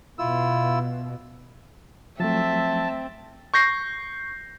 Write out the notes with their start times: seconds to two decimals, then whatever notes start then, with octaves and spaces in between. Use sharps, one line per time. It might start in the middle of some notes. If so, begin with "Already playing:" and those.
0.19 B2 E4 F4 E6
2.20 F3 F#3 A3 C4 E5 A5
3.54 C#6 G6 A#6 C7